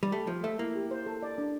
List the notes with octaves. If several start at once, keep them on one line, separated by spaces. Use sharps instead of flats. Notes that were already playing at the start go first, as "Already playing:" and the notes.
G3
A3 G4
F3 C5
A3 E5
A#3 E4
G4
C5
A4
D5
D4